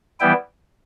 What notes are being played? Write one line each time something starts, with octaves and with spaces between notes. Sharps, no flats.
E3 G3 B3 E4 G5